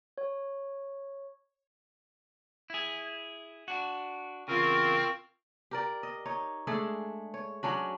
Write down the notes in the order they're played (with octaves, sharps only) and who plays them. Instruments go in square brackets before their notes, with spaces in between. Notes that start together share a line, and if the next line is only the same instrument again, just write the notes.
[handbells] C#5
[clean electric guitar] E4 G#4
D4 F#4
[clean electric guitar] E2 C#3 [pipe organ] C4 A#4 [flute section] F4 C#6
[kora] G4 A#4 D5
D#5
D#4 C#5
G#3 A3 D4 G#4
C#5
F#3 C#4 D4 F#4